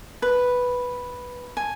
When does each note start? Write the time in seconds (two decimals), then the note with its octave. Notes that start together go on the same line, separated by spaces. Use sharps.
0.22 B4
1.57 G#5